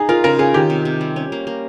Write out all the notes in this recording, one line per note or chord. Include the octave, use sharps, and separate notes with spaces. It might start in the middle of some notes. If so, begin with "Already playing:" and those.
Already playing: D#4 G#4
F4 A#4
C#3 A#4
C#4 G#4
D#3 G4
C3
C3
G3
C#4
A#3
A#3